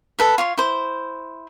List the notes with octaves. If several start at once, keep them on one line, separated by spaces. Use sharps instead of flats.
A4 B4 E5
F4 C#5 C6
E4 C5